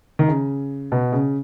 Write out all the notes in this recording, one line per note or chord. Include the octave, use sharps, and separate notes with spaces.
D#3
C#3
B2
C#3